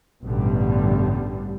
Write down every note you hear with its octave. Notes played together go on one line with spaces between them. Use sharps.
A1 G2 B2 D3 G3